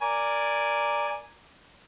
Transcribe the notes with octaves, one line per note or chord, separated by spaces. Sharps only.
A#4 D5 G#5